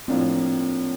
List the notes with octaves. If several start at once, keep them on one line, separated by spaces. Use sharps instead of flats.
A2 F3 A#3 C4 D4 F4